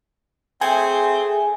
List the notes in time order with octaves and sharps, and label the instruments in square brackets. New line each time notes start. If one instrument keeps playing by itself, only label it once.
[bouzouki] A3 G#4 [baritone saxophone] C4 [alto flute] E5 [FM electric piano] G#5